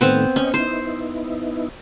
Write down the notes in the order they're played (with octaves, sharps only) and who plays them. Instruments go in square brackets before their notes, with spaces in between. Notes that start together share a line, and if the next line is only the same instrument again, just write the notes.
[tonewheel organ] A2 D#3 A3 [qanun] B3 C4
[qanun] C#4 [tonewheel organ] C#5 D#5 G5
[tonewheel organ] B3 D#4 E4 [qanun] C5